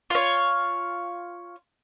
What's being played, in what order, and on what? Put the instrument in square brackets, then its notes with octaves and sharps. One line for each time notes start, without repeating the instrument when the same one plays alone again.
[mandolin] F4 C#5